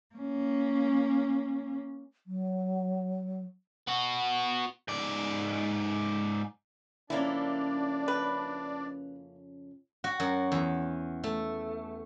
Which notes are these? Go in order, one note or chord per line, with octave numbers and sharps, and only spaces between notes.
A#3 C#4
F#3
B3 F#4
G#2 D5
F2 C#3 A#3 C#4 D4 E4 D5
B4
F#4
F#2
E2
A3